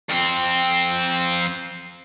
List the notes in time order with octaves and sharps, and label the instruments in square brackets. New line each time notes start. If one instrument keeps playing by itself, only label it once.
[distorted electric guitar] F2 C4